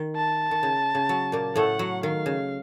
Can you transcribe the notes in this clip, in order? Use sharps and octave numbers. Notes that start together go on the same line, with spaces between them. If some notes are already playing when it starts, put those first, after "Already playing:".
Already playing: D#3
A5
D#3
C#3
C#3
F#3
A#2 A#3
A2 A3 F#5
F#3
D#3 F5
C#3